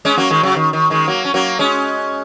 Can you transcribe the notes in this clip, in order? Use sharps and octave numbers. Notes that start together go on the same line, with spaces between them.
G#3 C#4
F#3 A#3
D#3 G#3
C#3 F#3
D#3
D#3
D#3 G#3
F#3 A#3
C#4
F#3 A#3
G#3 C#4